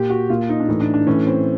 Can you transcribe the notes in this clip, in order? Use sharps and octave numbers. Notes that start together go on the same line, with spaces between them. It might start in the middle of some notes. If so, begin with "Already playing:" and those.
Already playing: A#2 G4
F#4
A#2 F4
D#4
D4
A2 E3 D#4
D4
D4
A2 E3 C#4
C4